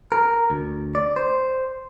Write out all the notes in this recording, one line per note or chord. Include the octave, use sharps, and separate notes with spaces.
A#4
D2
D5
C5